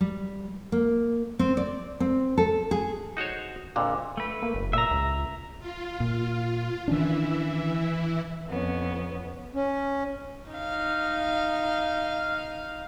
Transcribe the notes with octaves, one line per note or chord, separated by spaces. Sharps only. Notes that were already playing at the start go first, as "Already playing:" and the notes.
G3
A#3
C4
D5
C4
A4
G#4
D#4 F#4 C5 C#5
A#1 F2 A#2 D3
A3 B4
A#3
F#1
A#2 E5 A#5
C#2
F4
A#2
D#3 E3 C#4 D4 E4
F2 B3 C#4
C#4
D#4 F5